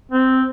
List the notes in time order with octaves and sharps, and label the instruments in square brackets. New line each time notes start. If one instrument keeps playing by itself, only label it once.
[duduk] C4